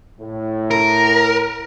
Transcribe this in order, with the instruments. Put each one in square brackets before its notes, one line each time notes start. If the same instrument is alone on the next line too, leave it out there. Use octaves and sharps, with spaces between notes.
[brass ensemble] A2
[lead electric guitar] A#4